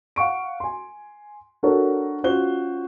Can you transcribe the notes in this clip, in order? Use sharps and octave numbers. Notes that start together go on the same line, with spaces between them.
F5 F#5 C#6 D7
G#5 C6
D4 F#4 A4 A#4 C5 C#5
C#4 F4 F#4 C5 F#6 G7